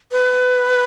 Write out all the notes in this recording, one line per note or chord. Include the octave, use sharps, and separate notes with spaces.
B4